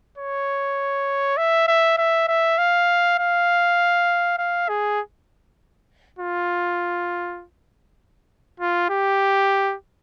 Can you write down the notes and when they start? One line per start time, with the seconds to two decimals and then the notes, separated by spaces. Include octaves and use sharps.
0.18 C#5
1.37 E5
1.68 E5
1.98 E5
2.28 E5
2.58 F5
3.18 F5
4.39 F5
4.69 G#4
6.19 F4
8.60 F4
8.90 G4